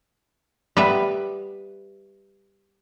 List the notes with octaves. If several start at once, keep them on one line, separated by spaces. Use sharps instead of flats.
G3 B3 B4 E5